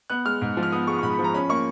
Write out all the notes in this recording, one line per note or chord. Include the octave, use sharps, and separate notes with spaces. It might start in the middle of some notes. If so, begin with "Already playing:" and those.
B3 F#6
G#3 F6
G#2
F3
F6
B3 D#6
G#3 C#6
C#6
G#2 B5
B5
F3
A#5
C#4 B5
A#3 C#6